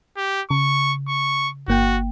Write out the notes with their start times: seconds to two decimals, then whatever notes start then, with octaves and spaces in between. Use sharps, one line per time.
0.17 G4
0.50 C#3 C#6
1.08 C#6
1.68 G1 A#3 F#4 G5